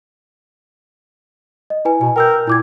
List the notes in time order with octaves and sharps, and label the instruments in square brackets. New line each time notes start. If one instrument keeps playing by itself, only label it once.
[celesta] D#5
E4 B4 G#5
[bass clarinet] B2 [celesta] G#5
[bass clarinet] A#4 [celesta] G5 E6 G6
[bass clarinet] A#2 [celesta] E4 D6 G#6